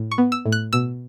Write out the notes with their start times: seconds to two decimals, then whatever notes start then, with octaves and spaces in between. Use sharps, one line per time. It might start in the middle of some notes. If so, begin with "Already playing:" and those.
Already playing: A2
0.11 C#6
0.18 B3
0.32 E6
0.46 A2
0.52 F#6
0.73 B2 E6